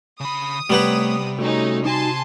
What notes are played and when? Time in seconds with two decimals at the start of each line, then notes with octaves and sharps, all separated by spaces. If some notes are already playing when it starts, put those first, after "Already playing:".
0.20 C#3 B5 D#6
0.70 C3 G3 A3 B3 B4 C#5
1.39 A3 C#4 D#4 F#4
1.85 D#4 F#4 G#5 A5 C6